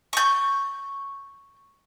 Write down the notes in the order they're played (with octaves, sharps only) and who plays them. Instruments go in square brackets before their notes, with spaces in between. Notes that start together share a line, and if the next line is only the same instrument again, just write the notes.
[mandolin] C#6 G6